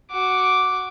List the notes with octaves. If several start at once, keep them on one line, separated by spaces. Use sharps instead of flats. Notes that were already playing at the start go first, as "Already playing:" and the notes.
F#4 D6